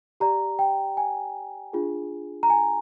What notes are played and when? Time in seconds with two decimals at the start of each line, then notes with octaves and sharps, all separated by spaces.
0.20 G4 D5 A#5
0.59 G5
0.97 G#5
1.73 D4 F4 G#4
2.43 A#5
2.50 G#5